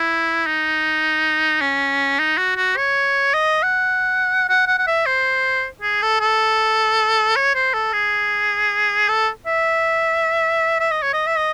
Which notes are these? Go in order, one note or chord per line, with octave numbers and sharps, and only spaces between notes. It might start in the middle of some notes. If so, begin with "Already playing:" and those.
Already playing: E4
D#4
C#4
D#4
F#4
F#4
C#5
D#5
F#5
F#5
F#5
F#5
E5
C5
G#4
A4
A4
C#5
C5
A4
G#4
A4
E5
E5
D#5
C#5
D#5
E5
D#5